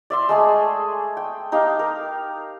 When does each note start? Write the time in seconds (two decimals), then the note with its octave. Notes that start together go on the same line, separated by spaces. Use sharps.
0.10 D5 E5 C6
0.29 G#3 A3 G#4
1.17 G5
1.52 D#4 G4 F5
1.79 A#4